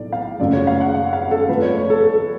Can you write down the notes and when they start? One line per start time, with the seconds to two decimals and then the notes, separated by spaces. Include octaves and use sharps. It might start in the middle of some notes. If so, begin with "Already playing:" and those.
Already playing: B1 A2 D5
0.12 F5
0.40 F#1 F#2 C#3 F3 A3 D5
0.53 C#5
0.67 F5
0.81 F#5
0.94 F#5
1.13 F5
1.31 A4
1.49 F2 F3 A3 B4
1.62 C#5
1.77 C#5
1.90 A4
2.04 A4